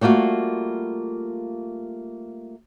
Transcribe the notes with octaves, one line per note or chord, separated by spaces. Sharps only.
G3 A3 A#3 F4 F#4